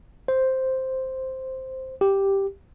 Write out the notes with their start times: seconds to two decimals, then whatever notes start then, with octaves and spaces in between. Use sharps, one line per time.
0.28 C5
2.01 G4